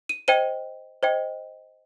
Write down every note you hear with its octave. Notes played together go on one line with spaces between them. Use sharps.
D#7
C5 D#5 G5 D#7
C5 D#5 G5